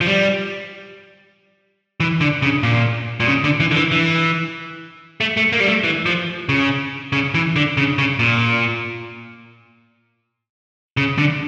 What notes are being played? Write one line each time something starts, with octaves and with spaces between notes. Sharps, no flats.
F3
G3
E3
D3
C#3
A#2
A#2
C#3
D3
E3
D3
E3
E3
A3
A3
A#3
G3
A3
E3
F3
C#3
C#3
E3
D3
C#3
C#3
A#2
C#3
D3